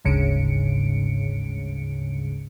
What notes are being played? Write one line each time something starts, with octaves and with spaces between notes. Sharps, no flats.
G1 D2 G#2 C#3 C#7 D7